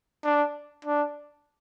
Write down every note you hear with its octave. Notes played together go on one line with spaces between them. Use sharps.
D4
D4